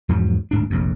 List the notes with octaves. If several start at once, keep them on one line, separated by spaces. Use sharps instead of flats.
E2 G#2 F3 F#3
D1 G#2 D4
F1 A#1 F2